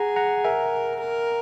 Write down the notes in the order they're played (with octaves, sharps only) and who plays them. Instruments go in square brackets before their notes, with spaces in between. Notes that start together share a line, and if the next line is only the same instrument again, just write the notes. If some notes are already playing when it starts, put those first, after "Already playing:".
Already playing: [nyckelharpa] G#4 [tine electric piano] F#5 A#5
[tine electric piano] F#5 A#5
[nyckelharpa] A#4 [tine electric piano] E5 G#5
[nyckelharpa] A#4